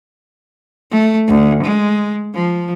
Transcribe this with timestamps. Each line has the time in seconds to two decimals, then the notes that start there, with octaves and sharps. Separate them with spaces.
0.91 A3
1.28 D2
1.63 G#3
2.34 F3